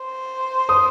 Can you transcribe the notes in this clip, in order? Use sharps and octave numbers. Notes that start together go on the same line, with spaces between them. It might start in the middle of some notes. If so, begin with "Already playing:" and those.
Already playing: C5
C6 D#6